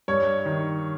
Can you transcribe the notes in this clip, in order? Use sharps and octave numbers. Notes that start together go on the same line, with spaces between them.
G2 C#5
D#3